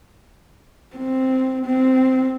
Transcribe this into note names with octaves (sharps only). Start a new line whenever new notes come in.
C4
C4